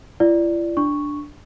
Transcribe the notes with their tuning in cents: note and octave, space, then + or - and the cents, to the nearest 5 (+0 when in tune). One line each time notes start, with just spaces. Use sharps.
E4 +45 D5 +0
D4 +0 C#6 +0